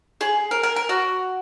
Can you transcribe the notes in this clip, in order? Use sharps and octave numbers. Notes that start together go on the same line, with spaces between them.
G#4
A#4
A#4
A#4
F#4